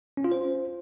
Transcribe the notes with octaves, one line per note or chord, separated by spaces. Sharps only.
C#4
F4
C5